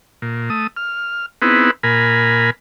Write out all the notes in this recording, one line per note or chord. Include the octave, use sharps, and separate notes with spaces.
A#2
A3 D#6
F6
B3 C4 D#4 E4 G#4 B4
A#2 A#4 G#5 B5